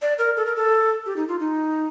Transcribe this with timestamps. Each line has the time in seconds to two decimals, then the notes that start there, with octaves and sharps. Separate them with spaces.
0.02 D5
0.18 A#4
0.37 A4
0.46 A#4
0.56 A4
1.06 G4
1.17 D#4
1.28 F4
1.40 D#4